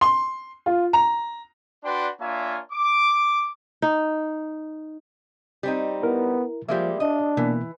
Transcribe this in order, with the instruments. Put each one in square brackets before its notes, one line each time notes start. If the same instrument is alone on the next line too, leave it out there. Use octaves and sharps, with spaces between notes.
[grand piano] C6
F4
A#5
[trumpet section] D4 F#4 B4 D5 G5 C6
A#3 D4 F4 C#5 E5 G#5
D6
[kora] D#4
[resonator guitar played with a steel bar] G3 C4 D#4
[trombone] B3 [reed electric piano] E4 A#4
[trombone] F3 [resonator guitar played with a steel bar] G3 G#3 A#3 [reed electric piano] E5
[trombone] D4 [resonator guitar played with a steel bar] D#5
[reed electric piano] B2 A#3 B3 [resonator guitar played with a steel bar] E3